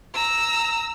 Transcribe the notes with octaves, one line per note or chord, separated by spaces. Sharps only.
A#5 E6